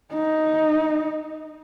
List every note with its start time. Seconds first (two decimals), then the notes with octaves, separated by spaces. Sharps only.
0.13 D#4